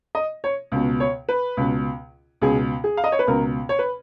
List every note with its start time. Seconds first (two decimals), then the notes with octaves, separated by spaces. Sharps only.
0.15 D#5
0.44 C#5
0.72 C#2 B2
1.00 C#5
1.29 B4
1.57 C#2 B2
2.41 C#2 B2 G#4
2.84 G#4
2.97 F5
3.04 D#5
3.12 C#5
3.19 B4
3.27 C#2 B2 A#4
3.69 C#5
3.79 B4